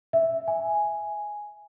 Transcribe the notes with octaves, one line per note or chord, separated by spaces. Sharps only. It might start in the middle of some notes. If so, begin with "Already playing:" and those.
E5
G#5